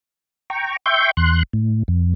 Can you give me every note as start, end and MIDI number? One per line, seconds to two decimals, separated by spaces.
0.50 0.77 79
0.50 0.77 82
0.50 0.77 85
0.86 1.11 76
0.86 1.11 79
0.86 1.11 84
0.86 1.11 85
0.86 1.11 91
1.17 1.43 40
1.17 1.43 84
1.17 1.43 90
1.53 1.83 45
1.88 2.14 41